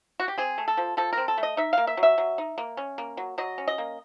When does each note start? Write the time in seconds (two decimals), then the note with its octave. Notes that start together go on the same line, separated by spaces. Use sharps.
0.20 F#4
0.28 G4
0.38 C4 G#4
0.58 A3
0.68 A4
0.77 F3
0.97 F3 A4
1.13 C4 A#4
1.28 A4
1.38 A3
1.43 D#5
1.57 D#4 E5
1.73 A#3 F5
1.87 E5
1.97 F#3
2.03 E5
2.18 F#3
2.38 D#4
2.58 A#3
2.77 C#4
2.98 A#3
3.17 F#3
3.38 F#3 D#5
3.58 C#4
3.68 D#5
3.78 A#3